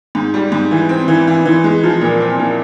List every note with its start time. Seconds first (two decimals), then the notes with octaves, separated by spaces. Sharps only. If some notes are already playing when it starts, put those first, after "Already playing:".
0.15 G#2
0.34 G3
0.52 G#2
0.71 E3
0.89 C4
1.08 E3
1.27 E3
1.45 E3
1.64 G#3
1.83 F3
2.01 A#2
2.20 C4
2.39 A#2